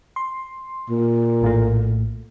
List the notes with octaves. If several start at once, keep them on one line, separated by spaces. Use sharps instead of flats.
C6
A#2
A#1 A2 A3